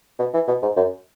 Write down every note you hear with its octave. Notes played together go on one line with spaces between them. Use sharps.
B2
E3
B2
G#2
F#2